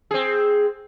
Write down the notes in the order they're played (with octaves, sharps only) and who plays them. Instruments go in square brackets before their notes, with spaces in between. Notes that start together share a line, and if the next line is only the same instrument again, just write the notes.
[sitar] C4 G#4